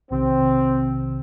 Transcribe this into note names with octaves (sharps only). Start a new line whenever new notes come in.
B1 C3 D#3 C4